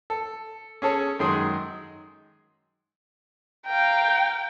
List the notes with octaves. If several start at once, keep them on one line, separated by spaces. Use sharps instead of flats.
A4
C#4 G#4 A4 C#5
F#2 D#3 G#3 G#4 C6
F5 G5 A#5